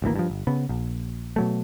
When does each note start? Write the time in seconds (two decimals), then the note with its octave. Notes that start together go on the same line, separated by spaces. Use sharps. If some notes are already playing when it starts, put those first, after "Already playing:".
0.02 G#1 D2 E3 A#3
0.16 G2 F3
0.30 G1
0.47 C#3 B3
0.69 A#1
1.36 B2 F#3 A3